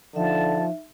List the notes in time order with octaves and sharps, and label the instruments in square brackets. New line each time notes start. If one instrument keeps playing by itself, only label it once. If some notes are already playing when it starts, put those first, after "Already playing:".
[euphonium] D3 [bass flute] F3 [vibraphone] D#4 E5 [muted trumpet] A5